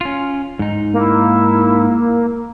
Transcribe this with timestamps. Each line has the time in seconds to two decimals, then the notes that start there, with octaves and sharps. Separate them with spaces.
0.01 C#4 F4
0.59 G#2 D#4
0.94 A#3 E4